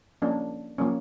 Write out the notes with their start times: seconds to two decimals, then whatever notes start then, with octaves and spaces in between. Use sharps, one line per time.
0.22 F3 A#3 C#4 D4
0.78 F3 A#3 C#4